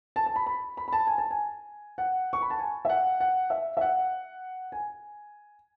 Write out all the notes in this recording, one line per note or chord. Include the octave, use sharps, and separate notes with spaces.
A5
A5
B5
B5
B5
B5
A5
G#5
A5
G#5
F#5
C#6
B5
A5
G#5
E5
F#5
F#5
E5
E5
F#5
G#5